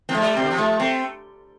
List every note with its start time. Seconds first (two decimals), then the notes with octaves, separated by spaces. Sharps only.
0.09 F3 C4
0.15 A3
0.22 G3
0.33 C3 C4
0.42 D3
0.51 F3
0.58 A3
0.80 A3 C4